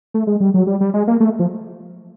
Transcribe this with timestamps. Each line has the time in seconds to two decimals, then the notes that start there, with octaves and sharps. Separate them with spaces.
0.14 A3
0.27 G#3
0.40 G3
0.54 F#3
0.67 G3
0.81 G3
0.94 G#3
1.07 A#3
1.20 A3
1.39 F3